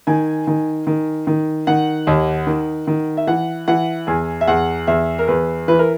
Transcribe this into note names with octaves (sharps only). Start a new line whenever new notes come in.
D#3 G#5
D#3
D#3
D#3
D#3 F#5
D#2
D#3
D#3
E5
E3 F#5
E3 F#5
E2 G#5
E5
E2 F#5
E2 E5
A#4
E2 B4
E3 B4
A#4